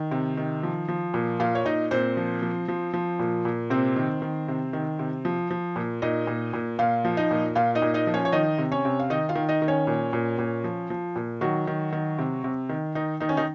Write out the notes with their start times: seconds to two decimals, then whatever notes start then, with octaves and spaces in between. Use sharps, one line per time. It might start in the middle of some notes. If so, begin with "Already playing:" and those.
Already playing: D#3
0.11 C3
0.37 D#3
0.63 F3
0.88 F3
1.14 A#2
1.39 A#2 F4 F5
1.55 C#5
1.65 A#2 D#4 D#5
1.91 A#2 C4 C5
2.17 F3
2.42 F3
2.68 F3
2.94 F3
3.19 A#2
3.45 A#2
3.70 C3 C4 C5
3.96 D#3
4.22 D#3
4.48 C3
4.73 D#3
4.99 C3
5.25 F3
5.51 F3
5.76 A#2
6.02 A#2 D#4 D#5
6.27 A#2
6.53 A#2
6.79 A#2 F4 F5
7.05 F3
7.17 D#4 D#5
7.31 A#2
7.55 A#2 F4 F5
7.75 D#4 D#5
7.82 A#2
7.94 D#4 D#5
8.07 F3
8.14 C#4 C#5
8.25 C#5
8.32 D#3 D#4 D#5
8.58 C3
8.72 C#4 C#5
8.85 C3
9.00 F5
9.10 D#3 D#4 D#5
9.29 F4 F5
9.35 D#3
9.49 D#4 D#5
9.62 D#3
9.68 C#4 C#5
9.87 A#2
10.13 A#2
10.38 A#2
10.64 F3
10.90 F3
11.16 A#2
11.41 D#3 F#3 F#4
11.67 D#3
11.92 D#3
12.19 C3
12.44 C3
12.69 D#3
12.95 D#3 D#4
13.20 D#3 D#4
13.29 C#4
13.37 D#3 D#4